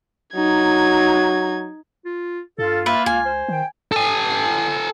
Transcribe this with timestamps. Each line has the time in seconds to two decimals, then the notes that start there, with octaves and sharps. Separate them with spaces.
0.35 F#3 D#4 G#6
2.05 F4
2.58 G2 F4 A4
2.86 A#3 B4 E5
3.06 C#2 G#5
3.25 C5
3.48 D#3 G5
3.92 A4 G#5